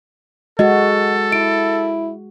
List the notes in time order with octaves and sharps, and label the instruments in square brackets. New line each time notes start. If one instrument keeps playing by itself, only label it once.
[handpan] G#3 F#4 [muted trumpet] A4 [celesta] D#5
[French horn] E4 [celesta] D7